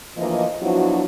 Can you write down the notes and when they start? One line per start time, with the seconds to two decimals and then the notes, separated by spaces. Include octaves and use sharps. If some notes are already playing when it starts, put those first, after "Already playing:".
0.17 D2 E3 F3 A#3 D#5
0.62 F3 F#3 B3 D4 E4 F#4